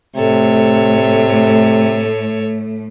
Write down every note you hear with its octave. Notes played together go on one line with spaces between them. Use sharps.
A2 C3 A3 A4 C#5